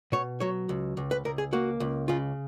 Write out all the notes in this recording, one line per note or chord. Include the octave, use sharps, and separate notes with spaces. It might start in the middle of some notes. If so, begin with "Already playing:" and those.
B2 C#5
F#3 C#5
C#2
C#2
B4
C#2 A#4
G#4
A#3 F#4
C#2
C#3 F4